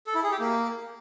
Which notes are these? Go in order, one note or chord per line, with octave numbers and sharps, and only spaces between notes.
A4
E4
G#4
G4
A#3